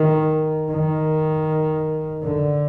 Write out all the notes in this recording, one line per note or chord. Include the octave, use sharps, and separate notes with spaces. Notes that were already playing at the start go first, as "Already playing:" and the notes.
Already playing: D#3
D#3
D3